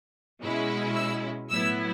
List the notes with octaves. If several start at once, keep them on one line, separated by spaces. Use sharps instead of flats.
B2 G#3 C#4 E4
E6
A2 F#3 B3 E4 E6